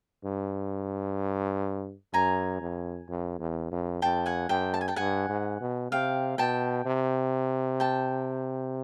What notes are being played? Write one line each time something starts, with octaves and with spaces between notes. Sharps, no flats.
G2
F#2 G#5 A#5
F2
F2
E2
F2
F2 G5 A5
F#5 G#5
F#2 G5 A5
A5
G#5
G5 A5
G2 F#5 G#5
G#2
B2
C3 F5 G5
B2 G5 A5
C3
G5 A5